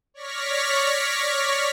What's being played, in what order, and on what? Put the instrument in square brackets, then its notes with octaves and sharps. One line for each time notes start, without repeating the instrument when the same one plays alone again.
[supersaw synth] C#5 D5 C#6 F6 A#6 B6